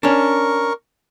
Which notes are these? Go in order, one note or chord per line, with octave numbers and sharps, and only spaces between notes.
C#4 D4 A#4 C#6